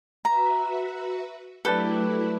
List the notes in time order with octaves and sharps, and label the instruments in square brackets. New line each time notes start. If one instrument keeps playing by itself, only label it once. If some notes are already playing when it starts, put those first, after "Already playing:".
[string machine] F#4 B4 E5 [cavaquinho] A#5
[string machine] F#3 A3 E4 [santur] D4 G4 B4 [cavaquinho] A4 G5